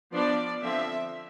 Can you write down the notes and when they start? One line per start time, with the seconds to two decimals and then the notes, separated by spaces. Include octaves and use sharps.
0.13 F3 B3 D4 D5
0.63 D3 F3 C4 E5